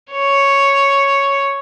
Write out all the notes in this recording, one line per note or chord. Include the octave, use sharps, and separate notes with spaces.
C#5